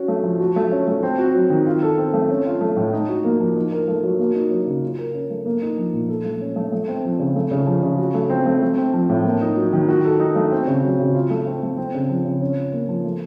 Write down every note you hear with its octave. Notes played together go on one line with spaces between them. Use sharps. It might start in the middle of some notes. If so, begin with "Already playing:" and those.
Already playing: C#4 F#4
A3
F3
F#4
A3
C#4
A3
C4
F#4
F#3
D#3
F4
A4
C4
A3
C#4
F4
A3
A2
D#4
F#4
A#3
F3
D#4
A#4
A3
F#3
A#3
D#4
F#3
C#3
F4
A#4
C#4
A3
A#3
D#4
F3
A#2
A4
A3
C#4
A3
A3
C4
F3
C#3
A3
C#3
F3
C#3
F#4
A3
C4
A3
A3
C4
F3
A2
A#3
D#4
F#3
D#3
F#4
A4
D#4
A3
C4
C#3
F#3
C#3
F4
A3
C4
A3
C4
C#3
F3
C#3
C#4
F4
A#3
F3
A3